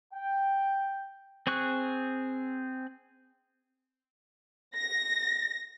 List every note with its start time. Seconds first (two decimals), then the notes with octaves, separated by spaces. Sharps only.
0.13 G5
1.47 C4 G#4 C#6 F#6
4.76 A#6